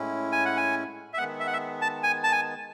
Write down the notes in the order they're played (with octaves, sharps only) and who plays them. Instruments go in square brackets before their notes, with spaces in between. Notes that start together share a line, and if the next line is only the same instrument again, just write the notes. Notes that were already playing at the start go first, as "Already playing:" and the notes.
Already playing: [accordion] A2 G#3 C#4 E4
[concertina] G#5
F#5
G#5
E5
[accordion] D#3 G#3 B3 [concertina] F#5
[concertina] E5
F#5
E5
A5
G#5
A5
G#5